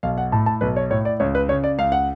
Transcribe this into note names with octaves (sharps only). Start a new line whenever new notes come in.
B1 F5
F#5
A2 A5
A5
B1 B4
C#5
A2 C#5
D5
C#2 C#5
B4
C#3 C#5
D5
C#2 F5
F#5